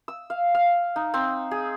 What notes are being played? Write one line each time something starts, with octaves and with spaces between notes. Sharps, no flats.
E6
F5
F5
D#4
C4
G#4